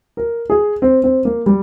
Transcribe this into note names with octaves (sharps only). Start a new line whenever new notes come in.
A#4
G#4
C4
C4
A#3
G3